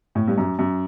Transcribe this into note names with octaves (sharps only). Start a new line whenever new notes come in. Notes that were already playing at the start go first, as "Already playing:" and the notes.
A2
G2
F#2
F#2